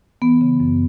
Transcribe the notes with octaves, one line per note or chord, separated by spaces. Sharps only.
E3 B3
C#3
F#2